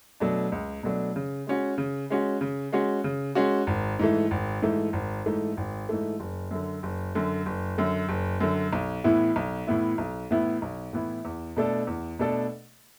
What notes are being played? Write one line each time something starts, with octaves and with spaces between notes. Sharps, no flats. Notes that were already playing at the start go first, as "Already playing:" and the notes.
B2 F#3 A3 D4
C#2
B2 F#3 A3 D4
C#3
G#3 C#4 F#4
C#3
G#3 C#4 F#4
C#3
G#3 C#4 F#4
C#3
G#3 C#4 F#4
G#1
G#2 E3 A3
G#1
G#2 E3 A3
G#1
G#2 E3 A3
G#1
G#2 E3 A3
F#1
F#2 D3
F#1
F#2 D3
F#1
F#2 D3
F#1
F#2 D3
B1
A2 E3 B3 E4
B1
A2 E3 B3 E4
B1
A2 E3 B3 E4
B1
A2 E3 B3 E4
E2
B2 A3 D4 A4
E2
B2 A3 D4 A4